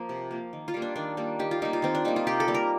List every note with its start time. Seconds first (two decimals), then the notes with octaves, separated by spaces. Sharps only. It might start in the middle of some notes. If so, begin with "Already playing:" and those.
Already playing: F3 A#3
0.09 C3
0.31 F3 A#3
0.53 D#3
0.68 F4
0.74 G3 A#3
0.82 D4
0.96 D#3 D4
1.17 G3 A#3
1.39 D#3 G4
1.51 F4
1.62 G3 A#3 D#4
1.73 F4
1.82 D#3 C4
1.95 D4
2.05 G3 A#3 D#4
2.16 F4
2.27 C3 G4
2.40 A4
2.48 G3 A#3
2.55 A#4